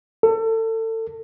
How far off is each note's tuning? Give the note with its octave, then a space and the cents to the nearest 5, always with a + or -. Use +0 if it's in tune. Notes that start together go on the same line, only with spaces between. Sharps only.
A4 +30